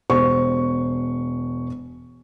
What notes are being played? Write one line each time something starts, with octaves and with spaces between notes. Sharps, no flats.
E1 C5 C#6